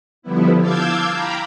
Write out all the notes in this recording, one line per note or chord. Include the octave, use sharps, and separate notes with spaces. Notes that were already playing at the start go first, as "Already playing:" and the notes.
D3 F3 G3 B3 E4
F5 A5 D6 E6 G6 G#6
F5 G5 A#5 B5